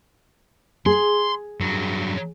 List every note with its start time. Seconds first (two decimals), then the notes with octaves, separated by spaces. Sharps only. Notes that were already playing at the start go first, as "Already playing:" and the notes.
0.86 G#4 C6
1.60 G2 F#3